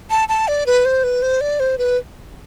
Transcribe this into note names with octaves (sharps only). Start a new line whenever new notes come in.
A5
A5
D5
B4
C5
B4
C5
D5
C5
B4